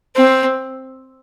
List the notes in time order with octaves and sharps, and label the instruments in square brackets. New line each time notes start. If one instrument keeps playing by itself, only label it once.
[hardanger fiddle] C4